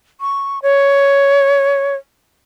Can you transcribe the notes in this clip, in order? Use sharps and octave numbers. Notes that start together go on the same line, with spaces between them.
C#6
C#5